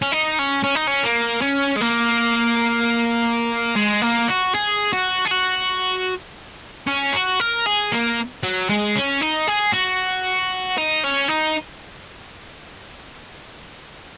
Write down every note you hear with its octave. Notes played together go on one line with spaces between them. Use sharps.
C#4
D#4
C#4
C#4
D#4
C#4
A#3
C#4
G#3
A#3
G#3
A#3
F#4
G#4
F#4
G#4
F#4
C#4
F#4
A#4
G#4
A#3
F#3
G#3
C#4
D#4
G#4
F#4
D#4
C#4
D#4